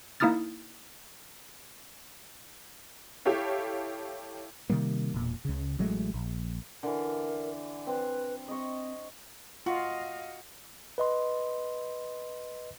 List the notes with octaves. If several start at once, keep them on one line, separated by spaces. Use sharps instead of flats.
A#3 D#4 E4 D#6 F6 A6
E4 G4 A4 C#5 F5
C3 D#3 G3 A#3
E1 A#2
C#2 C#3
A1 F#3 G#3 A3
A#1
D3 E3 A#4
C4 B4
C4 D#5 C#6
F4 F#4 D#5 F5
B4 D#5 C6